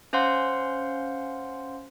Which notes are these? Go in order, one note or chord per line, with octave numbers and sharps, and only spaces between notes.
C#4 C5 F5 F#5 C6